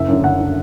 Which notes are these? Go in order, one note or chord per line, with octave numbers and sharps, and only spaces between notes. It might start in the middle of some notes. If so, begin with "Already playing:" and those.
Already playing: F#1 E5
F#2 D3
F#1 F#5
D3